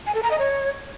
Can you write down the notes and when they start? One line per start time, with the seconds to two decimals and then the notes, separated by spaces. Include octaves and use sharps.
0.06 G#5
0.15 A4
0.23 A#5
0.31 D#5
0.39 C#5